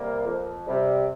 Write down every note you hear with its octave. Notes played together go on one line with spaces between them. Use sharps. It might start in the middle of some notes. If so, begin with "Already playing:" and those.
Already playing: C3 G3 A#3
F2
C3 G3